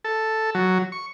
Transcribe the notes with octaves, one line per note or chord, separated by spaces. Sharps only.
A4
F#3
C#6